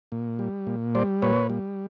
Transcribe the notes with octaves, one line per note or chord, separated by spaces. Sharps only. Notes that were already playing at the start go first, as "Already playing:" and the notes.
A#2
G3
A#2
G3 C5 D5
A#2 B4 C#5
G3